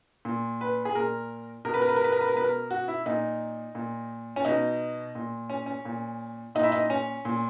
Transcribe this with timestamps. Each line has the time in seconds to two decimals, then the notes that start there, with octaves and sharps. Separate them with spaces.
0.25 A#2
0.61 B4
0.85 G#4
0.95 A#2 A#4
1.65 B2 A#4
1.74 B4
1.82 A#4
1.89 B4
1.96 A#4
2.04 B4
2.13 A#4
2.21 B4
2.28 A#4
2.36 B2 B4
2.44 A#4
2.71 F#4
2.88 E4
3.06 A#2 D#4
3.75 A#2
4.36 C#4
4.45 B2 D#4
5.15 A#2
5.50 C#4
5.66 C#4
5.85 A#2
6.55 A#2 D#4
6.63 E4
6.72 D#4
6.90 C#4
7.25 A#2